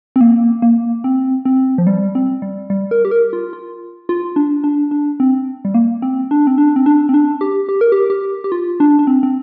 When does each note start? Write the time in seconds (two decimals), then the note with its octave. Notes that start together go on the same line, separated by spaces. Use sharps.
0.16 C4
0.21 A#3
0.62 A#3
1.04 C4
1.45 C4
1.78 F3
1.87 G3
2.15 C4
2.42 G3
2.70 G3
2.91 A#4
3.05 G4
3.11 A#4
3.33 F4
3.53 F4
4.09 F4
4.36 D4
4.64 D4
4.91 D4
5.20 C4
5.65 G3
5.74 A#3
6.02 C4
6.31 D4
6.47 C4
6.58 D4
6.76 C4
6.86 D4
7.09 C4
7.14 D4
7.41 G4
7.69 G4
7.81 A#4
7.92 G4
8.10 G4
8.44 G4
8.52 F4
8.80 D4
8.99 D4
9.07 C4
9.23 C4